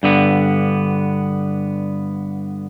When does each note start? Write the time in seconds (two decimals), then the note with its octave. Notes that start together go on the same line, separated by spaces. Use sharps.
0.03 G2 D3 B3